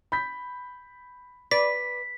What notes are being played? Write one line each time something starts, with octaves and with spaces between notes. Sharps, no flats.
B5 G6 B6
B4 D5 B6